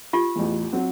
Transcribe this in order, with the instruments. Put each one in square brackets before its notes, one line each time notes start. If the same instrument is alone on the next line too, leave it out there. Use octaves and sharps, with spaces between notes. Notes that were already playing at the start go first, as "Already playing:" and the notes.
[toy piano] F4 G4
[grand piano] A1 E2
F#3 C4 F#4